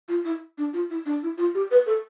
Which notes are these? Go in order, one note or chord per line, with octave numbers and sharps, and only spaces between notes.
F4
E4
D4
F4
E4
D4
E4
F4
G4
B4
A4